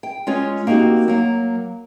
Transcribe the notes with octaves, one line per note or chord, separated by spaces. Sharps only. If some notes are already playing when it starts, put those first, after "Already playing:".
G5
G#3 C#4 F4 C#5
A#3 C4 D#4 F#4 G4
F#3 A#3